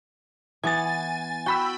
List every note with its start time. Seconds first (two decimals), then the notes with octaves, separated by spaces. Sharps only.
0.64 E3 B3 G#5 A6
1.46 F#4 G5 B5 E6